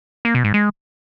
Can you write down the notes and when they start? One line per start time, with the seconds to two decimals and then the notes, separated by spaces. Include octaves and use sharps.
0.25 A#3
0.35 B2
0.44 G#2
0.54 G#3